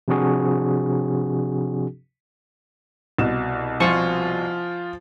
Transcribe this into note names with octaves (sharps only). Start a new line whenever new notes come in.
C3 F3 C4 D4 F#4 G#4
C2 B2 E7
F3 F4 C5 G#5 C#6